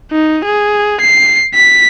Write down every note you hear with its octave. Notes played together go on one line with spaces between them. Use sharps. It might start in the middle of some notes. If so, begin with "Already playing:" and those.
D#4
G#4
C7
B6